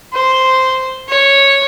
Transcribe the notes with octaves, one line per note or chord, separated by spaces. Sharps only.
C5
C#5